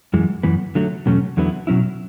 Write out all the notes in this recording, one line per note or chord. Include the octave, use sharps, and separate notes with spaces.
F#2 E3 G#3
F#2 E3 B3
D3 F#3 A3
E2 B2 F#3 A3 C#4
E2 D3 F#3 B3 E4
B2 F#3 C#4 E4